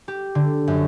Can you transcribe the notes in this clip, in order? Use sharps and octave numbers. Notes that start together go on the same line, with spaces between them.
G4
D3
F#2